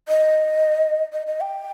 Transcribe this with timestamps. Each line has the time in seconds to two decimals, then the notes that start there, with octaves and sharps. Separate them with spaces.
0.08 D#5
1.13 D#5
1.27 D#5
1.41 G5